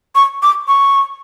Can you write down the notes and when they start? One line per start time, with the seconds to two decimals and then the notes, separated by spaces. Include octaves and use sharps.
0.15 C#6
0.43 D6
0.68 C#6